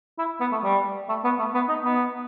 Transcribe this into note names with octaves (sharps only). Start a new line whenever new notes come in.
E4
B3
A3
G3
A3
B3
A3
B3
D#4
B3